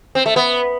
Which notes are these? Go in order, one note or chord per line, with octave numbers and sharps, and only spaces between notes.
C4
A3
B3